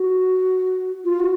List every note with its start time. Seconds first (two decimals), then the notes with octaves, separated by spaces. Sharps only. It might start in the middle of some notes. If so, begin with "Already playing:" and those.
Already playing: F#4
1.05 F4
1.20 F#4